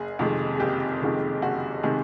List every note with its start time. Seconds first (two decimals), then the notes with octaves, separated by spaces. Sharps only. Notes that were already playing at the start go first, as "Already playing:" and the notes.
Already playing: F#1 G#4
0.19 F2 C3 D#3 G#3
0.55 G#4
0.60 F#1 G4
1.01 F2 C3 D#3 G#3
1.42 F#1 F#4
1.83 C3 D#3 G#3 G#4